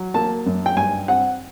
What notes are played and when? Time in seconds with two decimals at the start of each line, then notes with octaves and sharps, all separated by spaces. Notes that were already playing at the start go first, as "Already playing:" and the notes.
Already playing: F#3
0.14 A#3 A5
0.46 F#2
0.66 G5
0.76 G2 G#5
1.08 C4 F#5